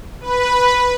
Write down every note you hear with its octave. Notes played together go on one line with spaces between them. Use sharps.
B4